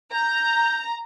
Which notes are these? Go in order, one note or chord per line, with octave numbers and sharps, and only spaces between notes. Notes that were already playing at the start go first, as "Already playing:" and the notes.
A#5 G6